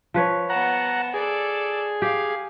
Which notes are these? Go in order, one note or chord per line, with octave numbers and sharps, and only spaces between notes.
F3 B4 C#5
B3 F#5 A5 A#5
G#4 A4 D5
G4 F5